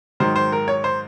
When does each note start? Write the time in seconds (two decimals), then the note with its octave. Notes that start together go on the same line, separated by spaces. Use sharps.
0.20 G#2 D#3 F#3 C5
0.36 C5
0.52 A#4
0.68 C#5
0.84 C5